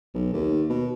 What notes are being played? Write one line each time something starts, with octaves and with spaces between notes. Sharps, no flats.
B1
D#2
B2